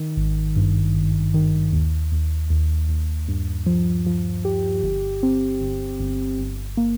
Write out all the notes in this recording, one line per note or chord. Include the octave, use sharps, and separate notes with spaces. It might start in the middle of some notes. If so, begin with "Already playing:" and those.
Already playing: D#3
G#1
G2
G#1
D#3
D#2
D#2
D#2
D#2
G2
F3
F3
G4
G1
C4
G1
G1
G1
A#3